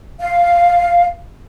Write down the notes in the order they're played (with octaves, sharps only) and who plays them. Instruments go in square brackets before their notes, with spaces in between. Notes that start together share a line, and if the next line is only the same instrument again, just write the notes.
[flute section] F5